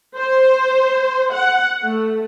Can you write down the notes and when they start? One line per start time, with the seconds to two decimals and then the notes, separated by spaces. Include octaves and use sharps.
0.16 C5
1.32 F#5
1.84 A3